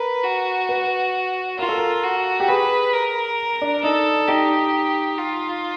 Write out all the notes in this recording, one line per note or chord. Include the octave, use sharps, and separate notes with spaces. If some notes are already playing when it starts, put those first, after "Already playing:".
Already playing: A#4 B4
F#4
B4
F4 A#4
A4
A#4
F#4
G4
G#4 B4
A#4
D4
D#4 A4
D#4 G4
F4